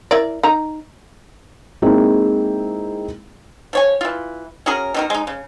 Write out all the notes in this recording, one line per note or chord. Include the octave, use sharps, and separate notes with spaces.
E4 A#4 D5
D#4 A#5
G#3 A#3 C4 D#4 E4 G#4
F3 C#5 G#5
E3 F4
C#4 F#4 G#4 A#4
B2 D#3 A#4
G#3 D#4
C#3